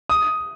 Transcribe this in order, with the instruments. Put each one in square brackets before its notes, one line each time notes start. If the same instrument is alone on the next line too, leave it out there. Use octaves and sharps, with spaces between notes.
[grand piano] D#6